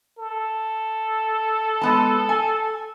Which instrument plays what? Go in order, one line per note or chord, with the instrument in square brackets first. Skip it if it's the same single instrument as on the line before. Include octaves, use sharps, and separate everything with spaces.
[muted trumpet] A4
[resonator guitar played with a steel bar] G#3 B3 A5
G#5